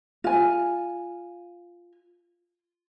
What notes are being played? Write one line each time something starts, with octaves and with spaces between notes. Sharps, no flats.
F4 G#5